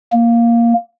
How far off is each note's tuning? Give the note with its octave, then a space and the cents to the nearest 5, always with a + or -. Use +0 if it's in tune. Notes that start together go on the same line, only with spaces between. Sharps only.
A#3 +0